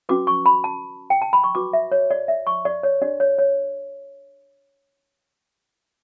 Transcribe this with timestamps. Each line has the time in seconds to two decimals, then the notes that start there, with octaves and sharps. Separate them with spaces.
0.09 C#4 F#4 B4 D6
0.27 C#6
0.46 B5
0.64 A5
1.10 G5
1.22 A5
1.33 B5
1.44 C#6
1.55 F#4 B4 D6
1.73 E5
1.92 C#5
2.11 D5
2.28 E5
2.47 C#6
2.65 D5
2.83 C#5
3.02 D4 G4 C#5 D5
3.20 C#5
3.38 C#5